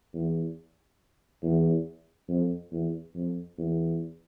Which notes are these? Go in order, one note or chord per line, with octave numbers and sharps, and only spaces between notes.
E2
E2
F2
E2
F2
E2